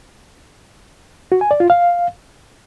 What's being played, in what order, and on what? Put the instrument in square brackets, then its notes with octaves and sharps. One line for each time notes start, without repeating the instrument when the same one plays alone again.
[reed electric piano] F#4
G#5
D5
F4
F5